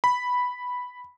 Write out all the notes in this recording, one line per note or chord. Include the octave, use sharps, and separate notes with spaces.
B5